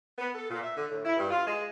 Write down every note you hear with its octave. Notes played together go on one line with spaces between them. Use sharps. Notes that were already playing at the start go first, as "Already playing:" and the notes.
B3
A4
A#2
E5
D3
A2
E4
G2
F4
G#3